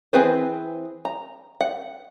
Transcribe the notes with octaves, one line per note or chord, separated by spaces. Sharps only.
E3 C4 G#4 B4 C5
A#5
F#5